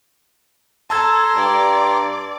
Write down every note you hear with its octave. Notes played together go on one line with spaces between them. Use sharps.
A4 A5 A#5 C6 E6 G#6
G2 D5